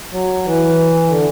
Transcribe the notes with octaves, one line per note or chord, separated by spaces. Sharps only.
F#3
E3
D3